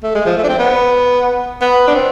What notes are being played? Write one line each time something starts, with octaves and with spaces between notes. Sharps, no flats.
A3
G#3
F3
A3
D4
C4
B3
B3
D4
C4